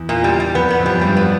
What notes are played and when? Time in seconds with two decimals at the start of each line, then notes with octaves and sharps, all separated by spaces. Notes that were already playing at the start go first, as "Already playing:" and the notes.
Already playing: E2
0.09 A#2
0.24 G3
0.40 G3
0.55 F2 B3
0.70 B3
0.79 F2
0.86 F#2 G3
1.01 G2 G3
1.17 B3